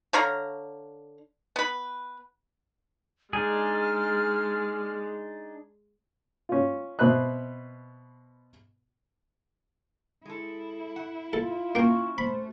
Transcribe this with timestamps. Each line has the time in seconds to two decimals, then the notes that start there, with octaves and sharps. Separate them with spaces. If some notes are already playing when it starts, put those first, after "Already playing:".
0.13 D3 C#5 F5 A#5
1.56 B3 B4
3.33 G#3 D4 D#4 G#4 F6
6.49 C#4 F4
6.99 B2 C4 B4 E5 F#6
10.25 G#3 E4 A4
10.96 F#5
11.33 F4 A4
11.75 A#3 C#4 F#4 G5
12.18 A3 C5 B5